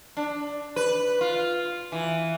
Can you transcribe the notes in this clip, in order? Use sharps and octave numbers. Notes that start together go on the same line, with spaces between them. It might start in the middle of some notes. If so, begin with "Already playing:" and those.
D4
B4
F4
E3